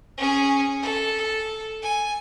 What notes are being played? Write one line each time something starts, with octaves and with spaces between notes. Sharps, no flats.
C#4 G#4
A4
G#5